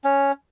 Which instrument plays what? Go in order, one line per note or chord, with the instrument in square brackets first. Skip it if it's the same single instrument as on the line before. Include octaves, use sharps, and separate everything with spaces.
[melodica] C#4